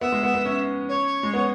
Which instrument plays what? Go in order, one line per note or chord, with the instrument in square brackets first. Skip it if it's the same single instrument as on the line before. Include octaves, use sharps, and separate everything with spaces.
[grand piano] B3 [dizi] E5
[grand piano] G#3
B3
B3
C#4
[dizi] C#5
[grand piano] G#3
B3